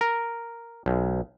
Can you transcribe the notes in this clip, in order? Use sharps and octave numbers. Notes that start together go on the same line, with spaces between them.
A#4
B1